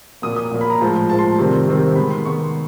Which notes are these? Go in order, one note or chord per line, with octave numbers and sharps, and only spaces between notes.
A#2 F#3 A#3 D#6
D#6
A#2 F#3 A#3
B5
A#5
A2 F3 G#3
A2 F3 G#3 A5
C6
C3 D#3 G3 C4
C3 D#3 G3 C4
D#3 G#3 B3 B5
C6
D#3 G#3 B3 C#6